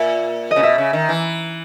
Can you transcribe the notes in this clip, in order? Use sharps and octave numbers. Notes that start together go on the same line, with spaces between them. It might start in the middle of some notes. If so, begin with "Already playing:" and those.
Already playing: A#2 E5
D#5
C#3
B2 E5
C#3
D#3
E3